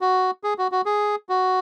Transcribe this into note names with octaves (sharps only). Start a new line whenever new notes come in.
F#4
G#4
F#4
F#4
G#4
F#4